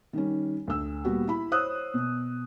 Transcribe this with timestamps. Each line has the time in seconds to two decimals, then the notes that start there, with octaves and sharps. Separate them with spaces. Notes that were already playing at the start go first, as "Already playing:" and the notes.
0.13 D#3 G3 C#4
0.68 D2 E6
1.04 A#2 G3 B3 F#4 G4
1.27 E4 B5
1.52 C5 C#5 D#6 E6 F#6
1.94 B2